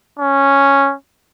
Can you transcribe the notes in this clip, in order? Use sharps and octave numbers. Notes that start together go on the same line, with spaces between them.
C#4